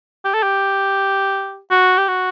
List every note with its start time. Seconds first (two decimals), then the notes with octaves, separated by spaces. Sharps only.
0.25 G4
0.34 A4
0.43 G4
1.71 F#4
1.98 G4
2.09 F#4